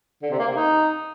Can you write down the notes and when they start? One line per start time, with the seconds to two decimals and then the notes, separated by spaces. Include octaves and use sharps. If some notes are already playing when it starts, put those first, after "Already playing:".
0.22 D3
0.31 C3
0.39 A#3
0.48 C3
0.56 D#4